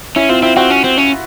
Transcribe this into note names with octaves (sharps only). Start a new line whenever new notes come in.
C#4 E4
C4 F4
C4 E4
C4 F#4
C#4
C4
C#4